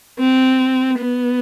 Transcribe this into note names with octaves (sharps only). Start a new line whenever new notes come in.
C4
B3